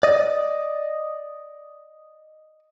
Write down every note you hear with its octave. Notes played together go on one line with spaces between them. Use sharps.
D5 D#5